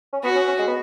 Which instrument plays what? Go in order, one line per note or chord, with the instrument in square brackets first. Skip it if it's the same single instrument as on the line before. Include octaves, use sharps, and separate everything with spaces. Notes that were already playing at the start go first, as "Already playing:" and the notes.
[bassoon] C#4
[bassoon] B3 [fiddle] F#4
[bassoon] C#4
C#4
G#3
B3